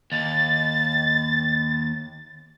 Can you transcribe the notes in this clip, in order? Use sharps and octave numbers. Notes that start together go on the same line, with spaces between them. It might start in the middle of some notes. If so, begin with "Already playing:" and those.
D#2 A6